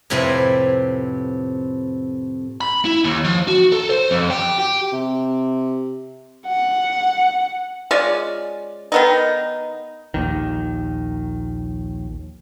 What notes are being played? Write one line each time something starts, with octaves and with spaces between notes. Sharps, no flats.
F2 A2 C3 C4 B4 G#5
B5
E4
D#2
F3
F#4
A4
C5
F2
G4
G4
C3
F#5
G#3 C#4 F4 D5
D#3 B3 D#4
A#1 D#2 D#3